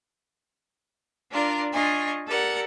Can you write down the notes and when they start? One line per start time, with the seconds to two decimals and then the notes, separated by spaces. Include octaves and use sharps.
1.31 D4 F4 A#4 D5
1.73 D4 F4 D#5 G#5 C#6
2.27 G4 A4 A#4 D5 F#5